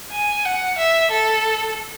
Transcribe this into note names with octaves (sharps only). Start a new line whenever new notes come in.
G#5
F#5
E5
A4